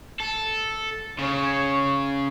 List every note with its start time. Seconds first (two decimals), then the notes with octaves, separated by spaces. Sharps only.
0.20 A4
1.19 C#3 C#5